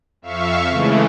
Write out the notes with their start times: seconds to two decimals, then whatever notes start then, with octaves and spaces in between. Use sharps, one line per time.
0.22 F2 E5 F5 C#6
0.69 C#3 E3 G#3 A3